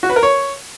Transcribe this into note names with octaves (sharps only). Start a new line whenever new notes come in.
F#4
B4
A#4
C#5